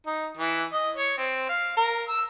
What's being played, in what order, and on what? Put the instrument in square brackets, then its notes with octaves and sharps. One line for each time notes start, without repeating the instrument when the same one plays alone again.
[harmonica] D#4
E3
D#5
C#5
C4
F5
A#4
E6